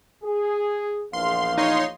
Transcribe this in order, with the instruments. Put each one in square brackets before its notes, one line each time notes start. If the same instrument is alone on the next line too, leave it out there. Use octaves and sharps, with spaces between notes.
[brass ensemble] G#4
[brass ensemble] A#1 E2 F5 [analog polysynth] C6
[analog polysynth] D#4 C#5 C6